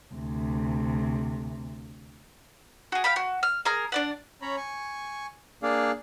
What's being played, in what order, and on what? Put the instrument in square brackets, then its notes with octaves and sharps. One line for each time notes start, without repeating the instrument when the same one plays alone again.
[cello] D2 C3
[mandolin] F#4 G#4
F5 G5 B5
F#4
F6
G#4 A#4 F6
D4 D5 F#5
[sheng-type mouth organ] C#4 C#5 A#5 B5
G#5 C#6
A#3 D4 G#4 D5 F5